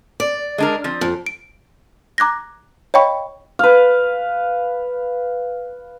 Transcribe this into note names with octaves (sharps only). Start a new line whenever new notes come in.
D5
G#3 D4 A#4
F3 C4
F2
D7
A#5 D6 F#6 G#6 A#6
C#5 D#5 F5 G5 B5 C#6
B4 F5